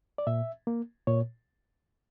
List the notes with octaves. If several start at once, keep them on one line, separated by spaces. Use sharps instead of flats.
D5
A#2 E5
A#3
A#2 C#5